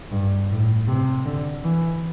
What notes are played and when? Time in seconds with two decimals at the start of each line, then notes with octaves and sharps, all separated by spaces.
0.12 G2
0.50 A2
0.88 C3
1.25 D3
1.64 E3